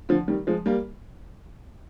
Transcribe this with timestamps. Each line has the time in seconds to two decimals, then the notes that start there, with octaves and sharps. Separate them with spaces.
0.09 D3 F3
0.28 D#3 G3
0.47 F3 G#3
0.66 G3 A#3